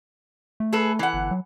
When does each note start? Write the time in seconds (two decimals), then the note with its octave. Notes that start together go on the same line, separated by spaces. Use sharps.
0.60 A3
0.73 G#4 A4 B4
0.99 E3 F#5
1.13 G1
1.31 F#3